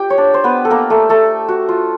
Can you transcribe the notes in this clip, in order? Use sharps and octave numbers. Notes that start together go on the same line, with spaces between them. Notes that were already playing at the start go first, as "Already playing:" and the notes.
Already playing: F4 G4 G5
C#5
D4 D5
C5
B3 B4
A4
A#3 A#4
A3 A4
A3 A4
F#4
F4